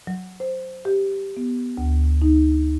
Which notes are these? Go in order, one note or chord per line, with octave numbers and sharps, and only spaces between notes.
F#3
C5
G4
B3
D2
D#4